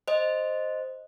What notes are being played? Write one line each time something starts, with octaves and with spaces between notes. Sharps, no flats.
C5 D#5